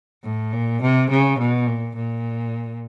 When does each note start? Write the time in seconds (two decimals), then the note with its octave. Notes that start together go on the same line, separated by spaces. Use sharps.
0.24 A2
0.53 A#2
0.81 C3
1.10 C#3
1.39 B2
1.67 A#2
1.96 A#2